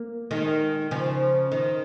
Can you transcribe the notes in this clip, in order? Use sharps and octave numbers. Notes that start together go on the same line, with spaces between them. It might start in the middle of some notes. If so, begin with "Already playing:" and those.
Already playing: A#3
D#3 G#3
C#3 F3
D#3